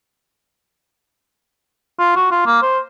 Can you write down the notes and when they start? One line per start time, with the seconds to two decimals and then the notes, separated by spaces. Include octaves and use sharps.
1.99 F4
2.16 F#4
2.31 F4
2.46 A#3
2.62 C5